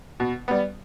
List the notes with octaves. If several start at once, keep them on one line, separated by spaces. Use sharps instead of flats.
B2
G3 B3